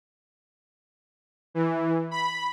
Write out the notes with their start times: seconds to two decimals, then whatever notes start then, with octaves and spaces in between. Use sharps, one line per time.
1.55 E3
2.11 B5